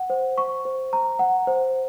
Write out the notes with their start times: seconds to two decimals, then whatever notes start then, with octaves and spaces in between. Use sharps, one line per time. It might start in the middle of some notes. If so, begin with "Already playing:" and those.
Already playing: F#5
0.10 C5
0.38 C#6
0.65 C5
0.93 A#5
1.19 F#5
1.47 C5